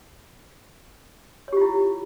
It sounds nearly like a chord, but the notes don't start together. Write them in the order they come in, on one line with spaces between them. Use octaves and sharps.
C#5 G4 F4 E4